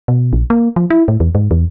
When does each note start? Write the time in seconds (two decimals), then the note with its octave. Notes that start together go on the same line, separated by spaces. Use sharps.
0.08 B2
0.33 A#1
0.50 A#3
0.76 F3
0.90 E4
1.08 A2
1.20 E2
1.35 G#2
1.51 E2